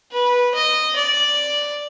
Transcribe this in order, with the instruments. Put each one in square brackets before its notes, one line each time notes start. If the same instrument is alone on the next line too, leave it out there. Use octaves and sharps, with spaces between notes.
[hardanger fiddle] B4
D#5
D5